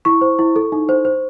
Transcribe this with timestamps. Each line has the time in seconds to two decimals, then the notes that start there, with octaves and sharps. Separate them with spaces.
0.05 E4 C#6
0.21 C5
0.39 E4
0.56 A4
0.72 D#4
0.89 C5
1.05 C5